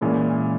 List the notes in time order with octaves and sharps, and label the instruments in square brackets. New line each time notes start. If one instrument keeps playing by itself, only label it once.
[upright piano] A#2 [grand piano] E3 G#3 C#4 E4